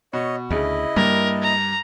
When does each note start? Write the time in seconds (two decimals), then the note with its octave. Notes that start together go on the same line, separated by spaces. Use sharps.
0.13 B2 C#5 D#5
0.51 D2 C#3 E4 D#5
0.96 G2 A#3 A#4
1.43 A#5